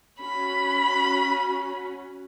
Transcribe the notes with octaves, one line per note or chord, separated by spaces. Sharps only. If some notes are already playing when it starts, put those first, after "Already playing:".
C#4 F#4 B5